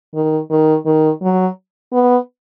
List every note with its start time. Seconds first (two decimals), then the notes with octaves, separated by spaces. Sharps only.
0.15 D#3
0.51 D#3
0.86 D#3
1.22 F#3
1.92 B3